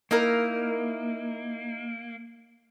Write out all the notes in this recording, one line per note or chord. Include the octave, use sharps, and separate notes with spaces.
A#3 D#4 E4 A#4